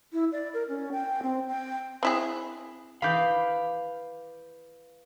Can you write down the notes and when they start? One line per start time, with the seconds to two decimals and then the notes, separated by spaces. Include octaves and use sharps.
0.13 E4
0.32 D5
0.54 A#4
0.68 C#4
0.92 G5
1.23 C4
1.48 G5
2.03 C4 E4 G#4
3.02 E3 G#4 F5 B5 D6 G6